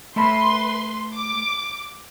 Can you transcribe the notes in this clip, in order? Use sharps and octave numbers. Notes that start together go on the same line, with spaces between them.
A3 B4 E5 B5 C6
D6